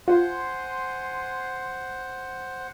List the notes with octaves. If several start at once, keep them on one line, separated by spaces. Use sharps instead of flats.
F4 C5 F#5 G#5 C6